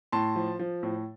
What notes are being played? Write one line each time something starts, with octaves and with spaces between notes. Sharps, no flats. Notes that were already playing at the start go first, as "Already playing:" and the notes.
A2 A5 C6
F3
F3
A2